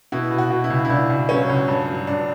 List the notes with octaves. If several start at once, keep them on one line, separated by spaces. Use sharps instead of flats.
B2 E4
B2
F#4
B2
E4
C#2
E4
C#2 D4
C#2
F#3 C#4
C#2
G2
F#3
G2 D4